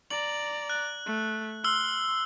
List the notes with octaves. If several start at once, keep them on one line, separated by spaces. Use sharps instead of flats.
D5 A#5 F#7
F#6
A3
C6 E6 F6 G7